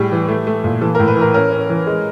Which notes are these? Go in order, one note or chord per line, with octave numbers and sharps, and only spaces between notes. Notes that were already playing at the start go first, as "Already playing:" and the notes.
Already playing: A2 G3 G#4
E3
A3
A3
A#2
E3 A4
A2 A#4
B4
E3 A#4
C#4 A#4
C#4
E3
G#3